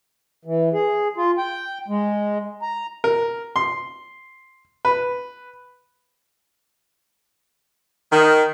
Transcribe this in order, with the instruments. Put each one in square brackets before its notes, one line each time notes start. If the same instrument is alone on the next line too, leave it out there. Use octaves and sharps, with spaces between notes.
[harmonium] E3
G#4
F4
G5
G#3
A#5
[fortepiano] A#4
C6
B4
[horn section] D#3